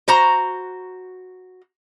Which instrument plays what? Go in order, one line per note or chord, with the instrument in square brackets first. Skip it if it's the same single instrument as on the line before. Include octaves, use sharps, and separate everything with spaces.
[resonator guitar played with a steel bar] F#4 C5 A#5